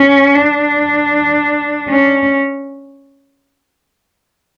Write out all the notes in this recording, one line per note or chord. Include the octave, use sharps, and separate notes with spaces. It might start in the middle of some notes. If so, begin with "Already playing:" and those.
Already playing: C#4
D4
C#4